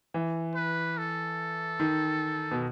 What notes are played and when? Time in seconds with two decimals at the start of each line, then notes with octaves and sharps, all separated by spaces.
0.14 E3
0.55 B4
0.98 A4
1.80 D#3
2.51 B2